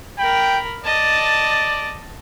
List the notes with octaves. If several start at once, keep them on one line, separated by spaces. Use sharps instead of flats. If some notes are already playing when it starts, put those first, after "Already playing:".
A#4 G5 B5
D5 D#5 A5